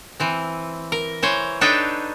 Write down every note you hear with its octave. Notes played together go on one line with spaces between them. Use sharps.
E3 C4
A#4
E3 C5 C#5
D4 D#4 A4 B4 C#5 G5